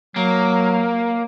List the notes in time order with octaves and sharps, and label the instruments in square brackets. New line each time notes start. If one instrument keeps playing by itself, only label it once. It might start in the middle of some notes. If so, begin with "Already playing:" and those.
[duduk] F#3 [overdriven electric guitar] A#3